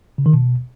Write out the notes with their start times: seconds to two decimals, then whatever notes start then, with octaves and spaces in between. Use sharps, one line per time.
0.18 C#3
0.26 D#3
0.33 B2